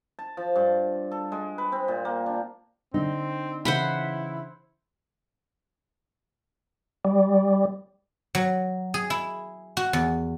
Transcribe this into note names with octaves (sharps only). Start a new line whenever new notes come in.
A5
F3
G2
A4
G#3
B4
C4
A#2
A#3
D4
D3 C4 D#4
C#3 E3 E4 C5 F#5 B5
G3
F#3
G#4
E4
F#4
E2